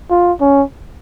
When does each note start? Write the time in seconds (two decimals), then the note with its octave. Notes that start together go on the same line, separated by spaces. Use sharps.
0.11 F4
0.41 C#4